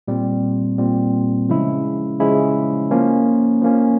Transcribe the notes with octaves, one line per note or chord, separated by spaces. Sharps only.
A#2 G3 C4
A#2 G3 C4
C#3 F3 G#3 C#4 E4
C#3 F3 G#3 C#4 E4
F3 A#3 C#4
F3 A#3 C#4